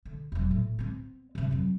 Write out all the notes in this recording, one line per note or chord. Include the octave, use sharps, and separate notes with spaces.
D3
E1 F#3
A2
B3 C4
G2 C3
F2 F#3